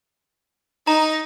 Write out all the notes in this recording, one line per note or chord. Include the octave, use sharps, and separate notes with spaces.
D#4 A#5